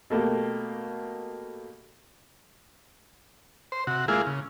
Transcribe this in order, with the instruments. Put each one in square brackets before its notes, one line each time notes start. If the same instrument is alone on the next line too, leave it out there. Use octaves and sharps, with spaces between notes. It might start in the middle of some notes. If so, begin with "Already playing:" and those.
[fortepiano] B2 A3 A#3 G4
[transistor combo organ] C5
C3 F#4
G#3 A#3 E4 F4 G#4
C#3